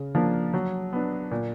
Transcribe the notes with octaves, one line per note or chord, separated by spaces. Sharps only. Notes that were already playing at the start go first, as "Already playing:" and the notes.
Already playing: C#3
F3 A#3 D4
F#3
B3 D4
A#2